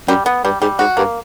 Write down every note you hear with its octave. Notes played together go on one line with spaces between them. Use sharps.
F#2 G3
B3
G2 G3
G#2 G3
G#2 F#4
G2 A#3